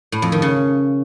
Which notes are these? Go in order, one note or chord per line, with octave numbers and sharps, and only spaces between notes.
A2
F2
D#3
C#3